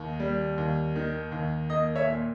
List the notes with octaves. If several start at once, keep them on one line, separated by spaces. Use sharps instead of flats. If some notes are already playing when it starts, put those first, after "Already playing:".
Already playing: D#2 D#3
G3
D#2
D#3
D#2
A#3 D#5
C#5 E5
A#2